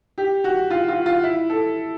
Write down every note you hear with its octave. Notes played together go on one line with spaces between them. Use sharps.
G4
F#4
F4
F4
F4
E4
A4